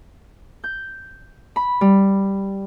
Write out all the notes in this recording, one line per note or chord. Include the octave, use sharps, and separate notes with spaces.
G6
B5
G3